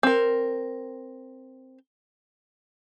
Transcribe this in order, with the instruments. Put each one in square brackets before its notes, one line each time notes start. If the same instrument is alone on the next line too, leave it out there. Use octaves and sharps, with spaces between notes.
[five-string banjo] C4 A#4